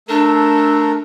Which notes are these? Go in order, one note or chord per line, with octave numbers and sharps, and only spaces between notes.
A3 D4 A4 A#4